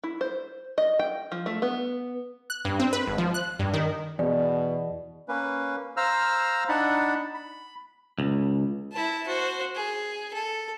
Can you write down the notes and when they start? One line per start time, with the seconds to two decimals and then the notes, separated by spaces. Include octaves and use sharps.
0.04 E4
0.21 C5
0.78 D#5
0.99 G5
1.32 F3
1.46 A3
1.62 B3
2.50 F#6
2.65 G2
2.80 C4
2.93 B4
3.07 G#1
3.18 F3
3.34 F#6
3.59 G2
3.74 D#3
4.19 E2 B2 D5
5.28 A#3 C#4 B4
5.97 C5 F5 A#5 E6 F6
6.69 D4 D#4 F#5 A5 B5
7.34 B5
8.19 C#2
8.92 E4 A5
9.27 F#4 C5
9.75 G#4
10.34 A4